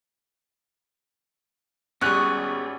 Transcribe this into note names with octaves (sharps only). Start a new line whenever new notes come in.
G#1 G3 B3 C#4 G#4 F#6